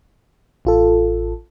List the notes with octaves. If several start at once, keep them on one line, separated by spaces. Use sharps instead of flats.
A1 F4 A4